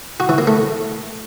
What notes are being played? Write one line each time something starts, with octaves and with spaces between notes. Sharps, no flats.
F#4
E3
A#3
A3